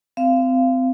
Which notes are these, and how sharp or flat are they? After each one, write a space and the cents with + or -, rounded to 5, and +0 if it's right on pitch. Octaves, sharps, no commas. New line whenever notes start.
C4 -25 F5 -20